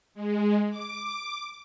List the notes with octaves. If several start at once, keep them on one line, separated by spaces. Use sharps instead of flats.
G#3
D6